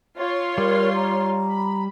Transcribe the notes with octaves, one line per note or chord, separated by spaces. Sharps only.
F4 C#5 C6
G3 A#4
A#5
B5